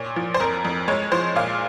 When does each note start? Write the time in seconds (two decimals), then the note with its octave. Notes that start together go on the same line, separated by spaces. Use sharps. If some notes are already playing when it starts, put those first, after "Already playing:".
Already playing: A#2 C#5
0.16 F3
0.34 C5
0.40 F2 A#4
0.65 F2
0.88 G#3 C#5
1.12 F3 C5
1.35 A#2 F5